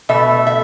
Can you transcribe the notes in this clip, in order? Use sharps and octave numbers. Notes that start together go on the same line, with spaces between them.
B2 A3 E5
E5